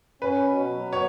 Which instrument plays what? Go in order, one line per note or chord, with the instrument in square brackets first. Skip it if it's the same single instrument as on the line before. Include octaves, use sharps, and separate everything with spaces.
[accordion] C#4 [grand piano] B4
[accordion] B2
F#3
[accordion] B3 [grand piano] C#5